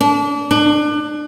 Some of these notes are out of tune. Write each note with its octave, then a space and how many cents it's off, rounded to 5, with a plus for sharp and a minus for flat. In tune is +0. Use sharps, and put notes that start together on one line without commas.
D4 -30
D4 +30